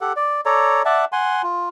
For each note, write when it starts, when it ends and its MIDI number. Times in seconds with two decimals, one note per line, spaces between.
0.01 0.13 67
0.01 0.13 69
0.01 0.13 78
0.16 0.41 74
0.46 0.82 69
0.46 0.82 73
0.46 0.82 74
0.46 0.82 82
0.85 1.05 74
0.85 1.05 76
0.85 1.05 78
0.85 1.05 81
1.12 1.42 78
1.12 1.42 80
1.12 1.42 84
1.43 1.69 65